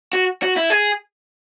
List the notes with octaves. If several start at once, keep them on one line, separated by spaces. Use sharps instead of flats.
F#4
F#4
E4
G#4